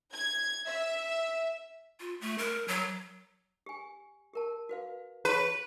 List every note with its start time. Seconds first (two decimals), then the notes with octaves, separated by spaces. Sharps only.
0.13 G#6
0.66 E5
2.00 F4
2.21 A3
2.38 A#4
2.68 F#3
3.66 G4 G#5
4.34 G4 A#4 A5
4.69 F#4 B4 F5
5.25 G4 B4 C#5 C#6